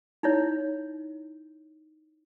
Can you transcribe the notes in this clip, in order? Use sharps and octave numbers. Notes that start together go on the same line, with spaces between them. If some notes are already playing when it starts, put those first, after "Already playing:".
D#4 E4 C#5